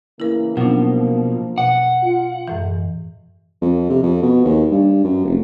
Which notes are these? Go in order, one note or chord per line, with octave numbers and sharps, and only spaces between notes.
C#3 E3 A#3 E4 A#4
B2 F3 F#3 A#3 C#4 D4
B2 F#5
F4
F#2 A2 E3 G#3
F2
C3
F2
B2
D#2
G2
F#2
F1